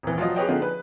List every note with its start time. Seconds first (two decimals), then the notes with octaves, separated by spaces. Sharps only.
0.03 D#1 E3
0.18 F3 F#3 F4 D#5
0.36 G4 G#4 B4 C#5 D#5 G5
0.48 D3 F3 A#3 D#4 G#4
0.62 B4